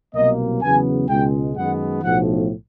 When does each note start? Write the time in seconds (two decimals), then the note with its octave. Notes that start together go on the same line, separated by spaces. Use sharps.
0.15 C2 B2 F#3 A#3 D#5
0.62 E2 C#3 F#3 B3 G#5
1.09 C#2 B2 G#3 G5
1.56 F#2 D#3 G#3 B3 F#5
2.03 B1 A2 F3 F#5